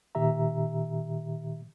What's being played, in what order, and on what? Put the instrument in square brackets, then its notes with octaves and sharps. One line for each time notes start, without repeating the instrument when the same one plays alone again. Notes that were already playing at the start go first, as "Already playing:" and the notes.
[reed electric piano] A#2 D#3 G4 E5 A#5